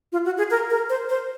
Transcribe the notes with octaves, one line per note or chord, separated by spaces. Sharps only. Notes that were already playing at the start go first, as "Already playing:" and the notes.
F4
F#4
G#4
A#4
A#4
C5
C5